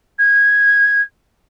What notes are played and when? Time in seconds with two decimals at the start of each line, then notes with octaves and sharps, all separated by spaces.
0.18 G#6